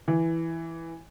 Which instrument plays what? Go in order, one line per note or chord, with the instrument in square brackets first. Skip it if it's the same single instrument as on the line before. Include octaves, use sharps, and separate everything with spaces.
[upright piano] E3